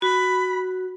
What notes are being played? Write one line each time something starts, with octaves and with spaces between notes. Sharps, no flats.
F#4 B5